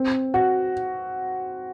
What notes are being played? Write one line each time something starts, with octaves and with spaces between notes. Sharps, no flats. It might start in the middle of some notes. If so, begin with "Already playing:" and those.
Already playing: C4
F#4